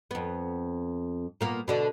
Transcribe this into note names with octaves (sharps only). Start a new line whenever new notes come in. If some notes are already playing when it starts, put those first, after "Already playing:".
F2 B3
A#2 A#3 B3
B2 D3 D4